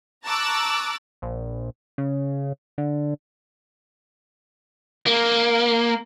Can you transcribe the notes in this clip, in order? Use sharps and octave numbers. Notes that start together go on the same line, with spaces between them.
A5 A#5 C#6 D6 E6 F#6
A#1
C#3
D3
A#3